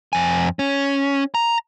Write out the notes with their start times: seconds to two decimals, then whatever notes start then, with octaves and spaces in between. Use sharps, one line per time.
0.13 F2 G#5
0.59 C#4
1.35 A#5